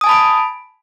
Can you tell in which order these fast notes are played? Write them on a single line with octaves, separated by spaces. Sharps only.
D#6 G#5 A5 B5 D7